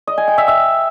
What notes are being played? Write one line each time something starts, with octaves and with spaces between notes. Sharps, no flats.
D#5
G#5
G5
E5
E5